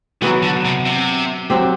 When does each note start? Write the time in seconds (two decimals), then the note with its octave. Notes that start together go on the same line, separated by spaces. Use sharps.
0.22 E3 F#3 B3 F#4
0.43 D3
0.65 C3
0.86 C3
1.50 F#3 C4 G4